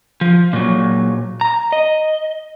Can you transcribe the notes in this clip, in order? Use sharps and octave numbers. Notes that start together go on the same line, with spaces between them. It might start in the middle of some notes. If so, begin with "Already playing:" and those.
F3
A#2 F#3
A#5
D#5